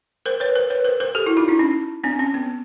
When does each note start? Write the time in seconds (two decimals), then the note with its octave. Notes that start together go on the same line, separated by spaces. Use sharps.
0.26 A#4 C5
0.40 B4 C#5
0.55 A#4 C5
0.70 B4 C#5
0.84 A#4 C5
1.00 A#4 C5
1.15 G4 A4
1.26 E4 F#4
1.37 D#4 F4
1.48 D4 E4
1.59 C#4 D#4
2.04 C4 D4
2.19 C#4
2.34 B3